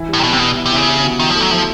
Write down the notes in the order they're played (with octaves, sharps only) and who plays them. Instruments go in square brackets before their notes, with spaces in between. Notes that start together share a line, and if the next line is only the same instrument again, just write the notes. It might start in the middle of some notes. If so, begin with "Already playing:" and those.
Already playing: [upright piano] E3 E4
G3
[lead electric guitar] A2
C3
[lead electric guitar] B2 [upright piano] B3
[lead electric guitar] C3
[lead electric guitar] B2 [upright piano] G3
[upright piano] E4
[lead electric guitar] C3
[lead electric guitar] C#3 [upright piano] E4
[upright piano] E4
B2
[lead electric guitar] D#3 [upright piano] E4
[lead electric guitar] F3 [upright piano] A3
[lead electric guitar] F#3
[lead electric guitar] F3 [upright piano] E4